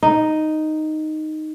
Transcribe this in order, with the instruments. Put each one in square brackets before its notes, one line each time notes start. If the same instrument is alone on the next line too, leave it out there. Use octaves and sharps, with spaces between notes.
[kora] D#4